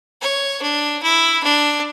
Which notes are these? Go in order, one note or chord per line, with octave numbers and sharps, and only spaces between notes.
C#5
D4
E4
D4